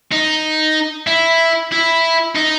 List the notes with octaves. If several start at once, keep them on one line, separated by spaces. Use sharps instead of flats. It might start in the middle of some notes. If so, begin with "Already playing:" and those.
D#4
E4
E4
D#4